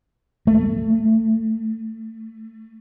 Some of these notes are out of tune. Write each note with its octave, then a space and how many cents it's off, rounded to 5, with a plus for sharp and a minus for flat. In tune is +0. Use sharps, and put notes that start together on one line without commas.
A3 +20